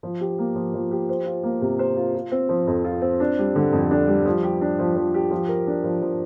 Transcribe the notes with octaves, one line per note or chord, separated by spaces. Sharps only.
F3
G4
A#3
F3
F3
G4
C5
F4
A#3
C3
C5
F4
F4
C4
F3
F2
F4
C4
D4
G3
D3
F2
D4
G3
F3
G4
D4
F3
F3
G4
F3
A#4
D4
F3
F3